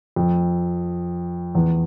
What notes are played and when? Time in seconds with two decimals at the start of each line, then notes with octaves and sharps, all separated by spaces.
0.16 F2
1.55 E2